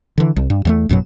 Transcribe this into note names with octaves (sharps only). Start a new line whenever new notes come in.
D3 E3
C2
G2
E2 F#3 A3
A1 F#2 B2 F#3